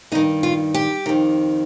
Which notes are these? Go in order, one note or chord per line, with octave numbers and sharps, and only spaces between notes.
G2 D#3 D#4
F4
G4
F2 D#3